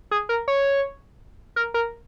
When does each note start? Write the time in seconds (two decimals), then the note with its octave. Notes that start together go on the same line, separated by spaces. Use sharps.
0.11 G#4
0.29 A#4
0.48 C#5
1.56 A#4
1.74 A#4